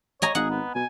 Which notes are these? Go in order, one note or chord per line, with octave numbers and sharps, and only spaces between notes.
C#5 D#5 G#5 A#5
G#1 G#4 F#5
B3
B2 G#5